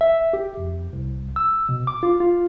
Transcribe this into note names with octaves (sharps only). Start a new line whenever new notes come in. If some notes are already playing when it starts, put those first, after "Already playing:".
E5
G4
F2
C2
E6
B2
D6
F4
F4